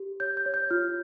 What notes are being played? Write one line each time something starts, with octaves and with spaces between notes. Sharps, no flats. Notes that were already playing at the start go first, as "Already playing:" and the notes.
Already playing: G4
C#5 G6
G6
C#5
G6
F4 F6